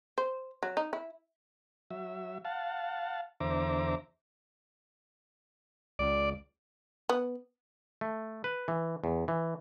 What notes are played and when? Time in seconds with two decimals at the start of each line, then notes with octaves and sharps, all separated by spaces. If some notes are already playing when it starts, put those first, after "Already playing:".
0.18 C5
0.63 F#3
0.77 D#4
0.93 E4
1.90 F#3 E5
2.45 F5 F#5 A5
3.40 E2 D3 C5 E5 A#5 D6
5.99 C#2 D5
7.09 B3
8.01 A3
8.44 B4
8.68 E3
9.04 E2
9.28 E3